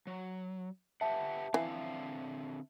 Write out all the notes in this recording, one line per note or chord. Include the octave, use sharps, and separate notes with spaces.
F#3
G4 B4 E5 F#5 A5
D3 E3 C4 F5